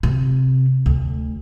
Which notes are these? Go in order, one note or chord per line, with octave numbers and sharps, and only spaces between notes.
C3
D2